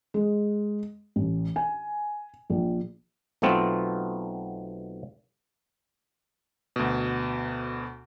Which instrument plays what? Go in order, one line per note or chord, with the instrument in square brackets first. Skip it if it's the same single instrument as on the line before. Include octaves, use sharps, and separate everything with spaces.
[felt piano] G#3
A1
G#5
A#1
[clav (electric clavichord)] B1 B2 A3 B3 C4 F4
[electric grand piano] D2 B2